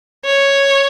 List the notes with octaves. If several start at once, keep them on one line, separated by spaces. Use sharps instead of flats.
C#5